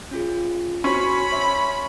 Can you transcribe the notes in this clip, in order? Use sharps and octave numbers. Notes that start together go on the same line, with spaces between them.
C#4 F4 G#4
C#4 F#4 C5 B5 C6
C#5 E5 C6